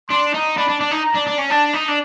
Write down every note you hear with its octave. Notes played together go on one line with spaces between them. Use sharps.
D4 C6
D#4
D4 B5
D4
D4
D#4
A#5
D4
D4
C#4
D4 A5
D#4
D4